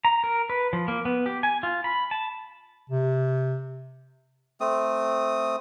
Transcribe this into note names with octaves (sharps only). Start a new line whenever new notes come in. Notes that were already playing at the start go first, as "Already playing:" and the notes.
A#5
A#4
B4
F3
A#3
B3
G4
G#5
F4
B5
A5
C3
A3 C4 D#6